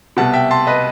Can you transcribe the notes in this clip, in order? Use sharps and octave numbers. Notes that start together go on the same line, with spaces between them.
C2 B2 F#5 A5
E5 G5
A5 C6
B4 D#5